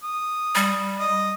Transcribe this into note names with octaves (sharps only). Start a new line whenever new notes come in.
D#6
G3
D#5 D#6